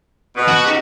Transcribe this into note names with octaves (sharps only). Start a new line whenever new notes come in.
B2
F#4
C#3 D#4 G4